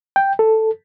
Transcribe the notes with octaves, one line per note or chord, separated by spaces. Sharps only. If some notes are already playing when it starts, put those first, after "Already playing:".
G5
A4